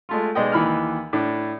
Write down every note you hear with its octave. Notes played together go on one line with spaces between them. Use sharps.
G#3 A3 F4
B1 G#3 D5 D#5 G5
D#2 E3 B5 F6
A2 D4